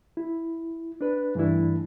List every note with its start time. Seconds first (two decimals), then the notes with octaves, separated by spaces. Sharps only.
0.17 E4
1.01 D4 B4
1.35 G2 E3 A3 D4 E4